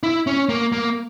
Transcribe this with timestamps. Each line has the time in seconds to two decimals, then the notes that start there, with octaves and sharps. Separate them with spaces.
0.03 E4
0.27 C#4
0.49 A#3
0.72 A#3